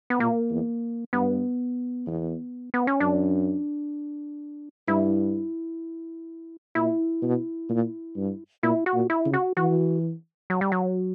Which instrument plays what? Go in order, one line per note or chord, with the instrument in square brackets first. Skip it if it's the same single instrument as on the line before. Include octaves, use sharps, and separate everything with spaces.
[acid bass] B3
[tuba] A#2 [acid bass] A#3
[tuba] E2
[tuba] G2 [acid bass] B3
[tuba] E2
[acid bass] B3
C#4
[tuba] F#2 [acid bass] D4
[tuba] G2 [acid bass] E4
[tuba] A#2 [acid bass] E4
[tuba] B2
A#2
G2
[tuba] A#2 [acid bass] E4
[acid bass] F#4
[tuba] A#2
[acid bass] E4
[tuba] C#3
[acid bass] F#4
[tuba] E3 [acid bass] F#4
[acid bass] F#3
G3
F#3